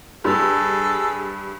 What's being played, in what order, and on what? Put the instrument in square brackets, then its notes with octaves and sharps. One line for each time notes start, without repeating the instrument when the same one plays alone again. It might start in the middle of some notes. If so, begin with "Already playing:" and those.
[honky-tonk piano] G2 [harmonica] G#4 A4